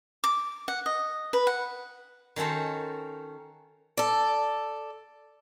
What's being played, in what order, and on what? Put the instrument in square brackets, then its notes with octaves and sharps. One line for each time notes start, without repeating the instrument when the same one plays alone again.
[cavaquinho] D6
F#5
D#5
B4
F#5
[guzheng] D#3 C#4 F#4 A4 C5
[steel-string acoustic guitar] A4 D5